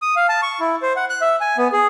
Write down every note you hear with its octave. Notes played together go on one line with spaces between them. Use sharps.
D#6
F5
A5
C#6
E4
C5
F#5
F#6
E5
G#5
B3
G#4